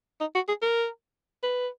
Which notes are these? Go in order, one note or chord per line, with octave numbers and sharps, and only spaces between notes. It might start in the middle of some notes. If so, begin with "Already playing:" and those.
D#4
F#4
G#4
A#4
B4